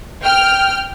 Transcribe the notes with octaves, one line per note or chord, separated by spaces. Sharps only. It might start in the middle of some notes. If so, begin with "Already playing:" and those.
G5 F6